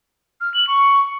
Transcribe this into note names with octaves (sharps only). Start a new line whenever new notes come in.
F6
F#7
C#6